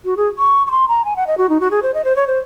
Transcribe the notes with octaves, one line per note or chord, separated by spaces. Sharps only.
F#4
G#4
C#6
C#6
C6
A#5
G#5
F#5
D#5
F#4
D#4
F#4
G#4
C5
D#5
C5
C#5
C5